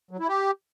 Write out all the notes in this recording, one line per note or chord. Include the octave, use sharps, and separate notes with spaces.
F#3
E4
G4